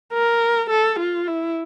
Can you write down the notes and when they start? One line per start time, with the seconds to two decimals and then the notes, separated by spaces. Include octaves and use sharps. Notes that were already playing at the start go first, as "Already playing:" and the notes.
0.13 A#4
0.70 A4
0.99 F4
1.28 E4